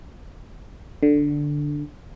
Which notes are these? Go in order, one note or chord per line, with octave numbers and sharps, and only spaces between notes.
D3